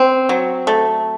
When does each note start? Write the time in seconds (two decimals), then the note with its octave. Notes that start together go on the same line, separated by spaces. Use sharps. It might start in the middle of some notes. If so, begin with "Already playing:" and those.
Already playing: C4
0.29 F#3
0.67 A3